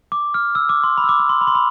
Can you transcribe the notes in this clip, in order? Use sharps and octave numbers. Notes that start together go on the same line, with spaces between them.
D6
F6
E6
D6
C6
B5
E6
D6
D6
C6
B5
C6
B5